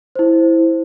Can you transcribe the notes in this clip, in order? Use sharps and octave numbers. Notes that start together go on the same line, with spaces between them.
E4 C5